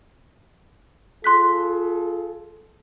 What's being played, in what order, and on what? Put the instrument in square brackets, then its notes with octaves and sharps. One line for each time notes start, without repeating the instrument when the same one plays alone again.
[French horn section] F4 G#4 A4 [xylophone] C6 F#6 B6